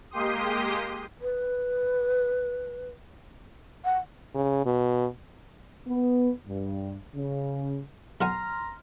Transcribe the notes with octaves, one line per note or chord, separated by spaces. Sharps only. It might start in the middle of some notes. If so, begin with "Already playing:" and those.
G#3 A#3 G4 C6 D#6
B4
F#5
C#3
B2
B3
G2
C#3
B1 F#5 G#5 A#5 C6 F6